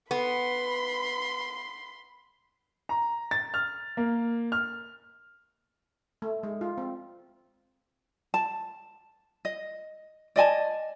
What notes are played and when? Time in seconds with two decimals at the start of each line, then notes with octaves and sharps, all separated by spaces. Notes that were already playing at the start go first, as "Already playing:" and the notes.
0.11 B3 B5 C6
2.89 A#5
3.31 A6
3.54 F6
3.97 A#3
4.52 F6
6.22 A3
6.43 G#3
6.61 F4
6.78 C4
8.34 A5
9.45 D#5
10.36 D5 D#5 G#5 A5